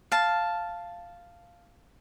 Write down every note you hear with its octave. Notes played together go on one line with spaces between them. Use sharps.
F5 A5